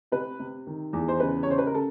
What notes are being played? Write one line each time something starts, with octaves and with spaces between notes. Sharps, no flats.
C3 B4
C3
D#3
E2
C5
C#3 B4
C#5
C#3 C5
B4
A#4
C#3 A4